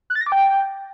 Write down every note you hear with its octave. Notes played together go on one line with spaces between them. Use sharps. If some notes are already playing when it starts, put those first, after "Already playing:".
F#6
A6
A#6
D6
G5